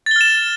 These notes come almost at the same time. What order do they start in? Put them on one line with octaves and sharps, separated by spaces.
A6 G7 F6 E7